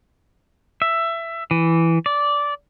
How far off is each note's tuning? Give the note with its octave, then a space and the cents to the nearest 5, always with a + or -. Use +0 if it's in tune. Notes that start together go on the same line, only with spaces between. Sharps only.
E5 +15
E3 +5
D5 -15